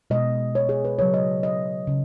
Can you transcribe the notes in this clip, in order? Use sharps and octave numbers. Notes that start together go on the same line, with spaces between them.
B2 G#3 D#5
C#5
G#4
B4
C#3 F#3 C#5
D#5
D#5
C#3